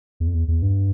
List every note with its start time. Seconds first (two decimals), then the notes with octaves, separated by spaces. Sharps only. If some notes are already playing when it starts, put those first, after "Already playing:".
0.20 E2
0.27 F2
0.34 E2
0.48 E2
0.62 G2